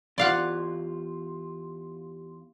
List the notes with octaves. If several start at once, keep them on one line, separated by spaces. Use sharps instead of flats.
E2 B3 F4 G4 D5 F5 F#5 C6